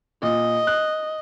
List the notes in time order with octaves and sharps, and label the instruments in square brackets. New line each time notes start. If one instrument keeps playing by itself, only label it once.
[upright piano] A#2 [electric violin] D#5
[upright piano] F#6